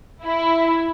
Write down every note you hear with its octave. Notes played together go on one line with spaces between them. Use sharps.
E4